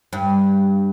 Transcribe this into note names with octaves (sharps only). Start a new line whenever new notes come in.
G2